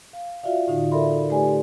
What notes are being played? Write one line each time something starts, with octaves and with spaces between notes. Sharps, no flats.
F5
F4 F#4 D5 E5 F5
A2 D3 D#4 F5
A4 A#4 D5 E5 B5 C6
A3 D#4 G4 B4 D5 G#5